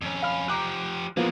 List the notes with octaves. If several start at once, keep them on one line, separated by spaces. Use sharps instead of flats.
F2 C#4
F5 B5 F6
F3 G4 A#5 D6 F#6
E3 F3 G#3 A#3 B3